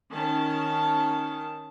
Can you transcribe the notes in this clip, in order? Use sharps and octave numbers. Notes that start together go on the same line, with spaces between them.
D#3 C#4 A5